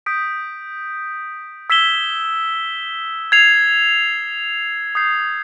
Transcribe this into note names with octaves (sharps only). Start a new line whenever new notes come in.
D#6 G6 B6 D7
E6 G#6 B6 E7 G7
G#6 C7 F7
D#6 G6 C7